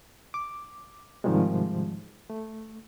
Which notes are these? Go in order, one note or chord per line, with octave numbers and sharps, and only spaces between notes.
D6
G#2 C3 D#3 F3 G3 G#3
A3